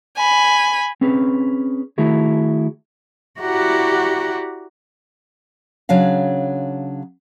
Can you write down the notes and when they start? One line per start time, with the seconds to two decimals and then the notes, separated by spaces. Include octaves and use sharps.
0.16 G#5 B5
1.01 C4 C#4 G#4 B4
1.98 D#3 A3 E4 F#4 G#4
3.40 E4 F#4 G4 D5 F#5 A#5
5.89 C#3 F#3 D4 F5